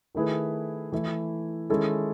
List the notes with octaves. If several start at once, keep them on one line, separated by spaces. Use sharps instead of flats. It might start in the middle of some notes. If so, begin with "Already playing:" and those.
D#3 A3 E4 G#4 B4
E3 A3 E4
D#3 G#3 C#4 E4 A4